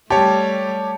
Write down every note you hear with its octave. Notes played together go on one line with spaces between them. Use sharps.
G3 A3 G4 C#5 A5